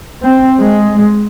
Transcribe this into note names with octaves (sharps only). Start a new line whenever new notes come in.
C4
G#3